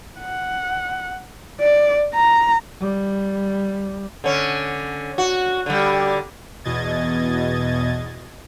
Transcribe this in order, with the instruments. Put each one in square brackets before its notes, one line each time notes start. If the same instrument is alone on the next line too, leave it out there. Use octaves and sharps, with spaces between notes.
[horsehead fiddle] F#5
D5
A#5
[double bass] G3
[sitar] D3 C#4
F#4
D3 G3
[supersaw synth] E2 B2 D#5 G#6 A6